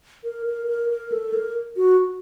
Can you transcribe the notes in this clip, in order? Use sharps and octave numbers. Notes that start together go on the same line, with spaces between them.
A#4
A#4
A#4
A#4
A4
A#4
F#4